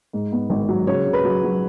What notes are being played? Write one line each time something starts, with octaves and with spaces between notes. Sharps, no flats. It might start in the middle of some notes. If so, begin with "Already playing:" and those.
G#2
B3
G#1
F#3
C#3 C#5
C#3
B4
F#3
F#3